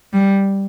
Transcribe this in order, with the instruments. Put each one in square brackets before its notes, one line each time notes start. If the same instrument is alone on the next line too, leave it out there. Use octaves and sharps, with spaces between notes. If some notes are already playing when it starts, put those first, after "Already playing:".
[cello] G3